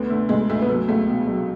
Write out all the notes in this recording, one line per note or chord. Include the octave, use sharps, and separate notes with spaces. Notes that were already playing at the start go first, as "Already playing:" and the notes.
Already playing: D2 B3
D3 A3
D2 G#3
D2 A3
B3
F#3 A3
C#2 A3
B2
F#3